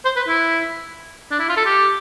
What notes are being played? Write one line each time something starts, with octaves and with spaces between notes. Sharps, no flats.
C5
B4
E4
D4
E4
F4
A4
G4